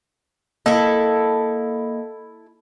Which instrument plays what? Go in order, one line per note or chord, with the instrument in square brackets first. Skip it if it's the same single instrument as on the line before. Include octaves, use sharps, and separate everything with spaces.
[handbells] A#3 D#5 [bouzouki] E4 A4